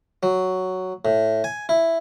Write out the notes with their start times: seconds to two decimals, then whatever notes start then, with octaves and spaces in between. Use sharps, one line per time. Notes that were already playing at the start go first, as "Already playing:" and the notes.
0.23 F#3
1.05 A2
1.44 G#5
1.69 E4